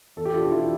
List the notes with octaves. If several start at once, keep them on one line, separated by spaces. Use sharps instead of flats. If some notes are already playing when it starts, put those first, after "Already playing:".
E2 A4
G4
B2 B3 D4 F4
G4
E2 E4